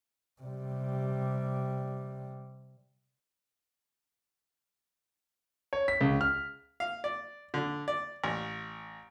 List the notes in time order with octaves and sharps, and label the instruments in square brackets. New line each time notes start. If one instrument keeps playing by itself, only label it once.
[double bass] C3 G3
[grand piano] C#5
B6
C#2
F6
[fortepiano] F5
D5
D3
D5
A1